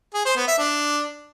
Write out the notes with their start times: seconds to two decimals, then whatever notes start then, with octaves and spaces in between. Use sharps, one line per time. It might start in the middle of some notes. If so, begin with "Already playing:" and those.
0.14 G#4
0.25 C5
0.36 B3
0.47 E5
0.58 D4